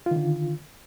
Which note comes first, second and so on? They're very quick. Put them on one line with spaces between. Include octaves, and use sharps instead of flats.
F4 D#3 D3